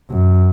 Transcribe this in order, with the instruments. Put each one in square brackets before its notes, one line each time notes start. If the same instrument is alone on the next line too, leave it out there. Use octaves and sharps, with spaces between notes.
[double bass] F#2